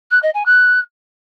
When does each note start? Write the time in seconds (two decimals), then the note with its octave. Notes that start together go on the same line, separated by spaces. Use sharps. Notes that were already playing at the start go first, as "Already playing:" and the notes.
0.11 F#6
0.23 D#5
0.34 G#5
0.46 F#6